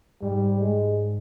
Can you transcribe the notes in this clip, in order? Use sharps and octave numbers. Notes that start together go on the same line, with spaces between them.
G#2 G3
G#3